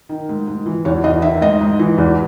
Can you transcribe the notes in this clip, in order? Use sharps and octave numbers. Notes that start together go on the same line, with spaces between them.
D#3
G#2
G#2
E3
E2 C#5
E2 D#5
D#3 E5
G#2 D#5
G#2
E3
E2